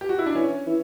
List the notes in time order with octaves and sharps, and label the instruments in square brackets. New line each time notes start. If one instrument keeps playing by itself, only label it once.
[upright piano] G4
F#4
E4
D4
[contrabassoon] E3 [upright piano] C#4
[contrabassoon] E3